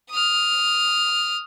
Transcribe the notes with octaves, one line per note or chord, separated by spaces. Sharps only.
D#6 F6